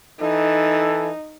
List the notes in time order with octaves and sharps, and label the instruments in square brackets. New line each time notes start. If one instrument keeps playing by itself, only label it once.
[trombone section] E3 A4 [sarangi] D#4